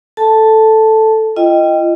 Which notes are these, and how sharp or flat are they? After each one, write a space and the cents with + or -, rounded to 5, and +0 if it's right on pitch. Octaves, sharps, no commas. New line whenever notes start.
A4 +0 A5 +0
F4 -35 D#5 +0 G5 +0